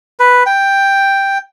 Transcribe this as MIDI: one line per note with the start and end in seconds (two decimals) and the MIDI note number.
0.19 0.43 71
0.46 1.38 79